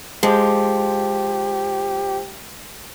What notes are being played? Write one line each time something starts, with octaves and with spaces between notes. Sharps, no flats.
F3 G#3 G4